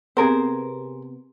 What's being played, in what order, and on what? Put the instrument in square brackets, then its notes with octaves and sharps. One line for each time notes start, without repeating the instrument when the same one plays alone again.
[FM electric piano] C3 B3 [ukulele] G#4 A#4 C5